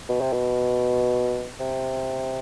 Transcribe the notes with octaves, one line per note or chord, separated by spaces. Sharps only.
B2
C3
B2
C3